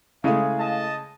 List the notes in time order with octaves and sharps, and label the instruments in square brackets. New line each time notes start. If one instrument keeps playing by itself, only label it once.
[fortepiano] C#3 G#3 G#4 [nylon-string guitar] A3 E4 [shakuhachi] F5
[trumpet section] D#5 A5